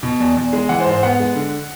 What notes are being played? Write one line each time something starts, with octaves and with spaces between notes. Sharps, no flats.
B2
E2
E2
G#3
E3 F#5
C5
G#2
C5
B3 F#5
G#3
D3